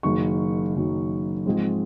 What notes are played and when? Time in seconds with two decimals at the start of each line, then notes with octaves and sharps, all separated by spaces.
0.03 F#1 F#2 D#3 C#6
0.75 F#1 F#2 D#3
1.46 G#2 F3 G#3 C4